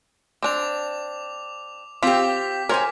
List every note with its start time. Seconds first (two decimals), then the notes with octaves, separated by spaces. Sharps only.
0.42 C4 D4 D6 F7
2.02 C4 F4 G4 D6 B6 F7
2.69 A#4 C5 C#5 G#5